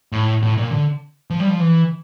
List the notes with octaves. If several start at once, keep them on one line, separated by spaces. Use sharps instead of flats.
A2
A2
A#2
D3
F3
G3
F3
E3